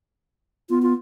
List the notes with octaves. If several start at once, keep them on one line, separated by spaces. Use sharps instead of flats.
B3 F4
F4